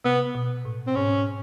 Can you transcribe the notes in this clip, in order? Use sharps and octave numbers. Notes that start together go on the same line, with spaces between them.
C3 B3
B2
A2
C4
G#2 C#4